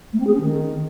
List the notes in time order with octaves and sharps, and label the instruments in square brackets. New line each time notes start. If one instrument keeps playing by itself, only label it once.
[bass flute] A3
C4
G#4
C#4
D#3